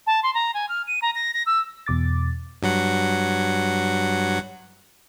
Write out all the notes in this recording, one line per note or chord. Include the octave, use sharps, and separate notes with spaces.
A5
C6
A#5
G#5
F6
D#7
A#5
A#6
A#6
E6
E2 B2 D6 A6
G2 F#3 F#5